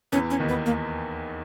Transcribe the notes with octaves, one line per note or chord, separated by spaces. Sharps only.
E2 E3 C#4
C#4
D#2 D#3
B3
A#3